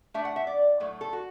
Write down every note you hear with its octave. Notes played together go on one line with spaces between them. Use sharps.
A2 A3 D4 E5
F#5
E5
D5
A2 F#3 A3
A4
F#4